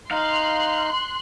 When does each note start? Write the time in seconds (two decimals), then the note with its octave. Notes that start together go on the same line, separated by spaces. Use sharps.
0.11 D#4 F5 C6 F#6